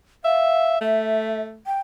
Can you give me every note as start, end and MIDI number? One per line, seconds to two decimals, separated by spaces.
0.24 0.78 76
0.24 0.76 77
0.81 1.60 57
0.81 1.40 76
1.66 1.79 79